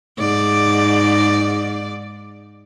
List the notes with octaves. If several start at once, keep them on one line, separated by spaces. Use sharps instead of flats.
G#2 D5